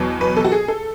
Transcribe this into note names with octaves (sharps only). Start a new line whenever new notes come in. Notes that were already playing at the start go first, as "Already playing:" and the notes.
Already playing: E2 B2 F#3
B4
A4
F#4
G#4
A4